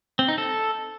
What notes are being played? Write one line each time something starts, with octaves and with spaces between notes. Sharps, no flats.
C4
D#4
A4